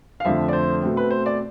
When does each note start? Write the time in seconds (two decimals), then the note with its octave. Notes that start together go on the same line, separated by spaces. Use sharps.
0.20 F5
0.25 F2 D3 F3 A3 C4 E5
0.48 D5
0.53 C5
0.82 B2 A3 C4
0.97 B4
1.11 C5
1.26 D5